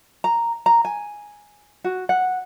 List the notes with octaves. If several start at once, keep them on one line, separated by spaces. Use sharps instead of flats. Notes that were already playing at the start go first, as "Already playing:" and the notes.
A#5
A#5
G#5
F#4
F#5